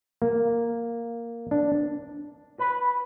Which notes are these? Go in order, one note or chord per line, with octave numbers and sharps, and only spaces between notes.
A#3
D4
B4